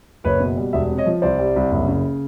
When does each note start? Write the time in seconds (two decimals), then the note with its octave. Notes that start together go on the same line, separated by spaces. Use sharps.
0.24 F#1 B4 C#5
0.40 B2
0.57 G3
0.73 E1 D5 E5
0.90 C3
0.97 C#5 D#5
1.06 F3
1.22 C2 C5 D5
1.38 G3
1.56 C2
1.72 F#1
1.88 C#3